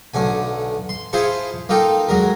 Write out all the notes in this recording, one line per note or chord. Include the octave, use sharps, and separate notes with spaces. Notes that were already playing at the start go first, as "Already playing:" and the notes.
B1 D3 A3 G#5
C6
E4 F4 G#4 C5 A5 C#6
A#3 D#4 F4 A4 G5
F#3 G#3 A#4